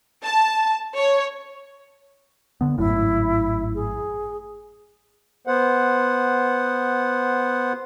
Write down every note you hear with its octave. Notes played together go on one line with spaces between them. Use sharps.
A5
C#5
D3 B3
G#1 F#2 A2 E4
G#4
B3 C5 F#5